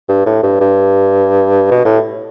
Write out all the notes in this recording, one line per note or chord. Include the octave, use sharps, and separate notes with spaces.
G2
A2
G2
G2
B2
A2